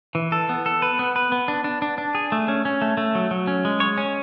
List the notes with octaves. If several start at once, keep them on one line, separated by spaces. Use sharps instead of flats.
E3
A4
B3
A4
B4
B3
B4
B3
D4
D4
D4
D4
G#4
A3
C#4
C#4
A3
A3
F#3
F#3
C#4
G#3
C#5
C#4